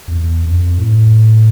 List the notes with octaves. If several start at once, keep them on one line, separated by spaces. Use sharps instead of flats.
F2
E2
F2
A2